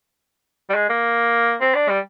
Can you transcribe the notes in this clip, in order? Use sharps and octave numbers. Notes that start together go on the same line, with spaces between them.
G3
G#3
A#3
C4
D4
G3